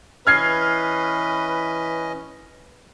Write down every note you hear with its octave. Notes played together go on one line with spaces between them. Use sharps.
E3 C#4 B4 D#5 F6 G#6 C7